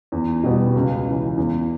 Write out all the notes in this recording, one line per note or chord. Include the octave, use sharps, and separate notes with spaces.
E2
B2 G3 B3
C#2
C#3 E3
E2